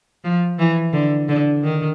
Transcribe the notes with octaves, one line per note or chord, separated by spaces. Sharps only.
F3
E3
D3
D3
D#3